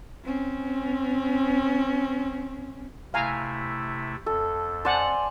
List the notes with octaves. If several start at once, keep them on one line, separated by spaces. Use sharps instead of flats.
C4 C#4
C3 A3 E4 F5 G#5 A#5
F2 A4
C5 D5 F#5 G#5 A5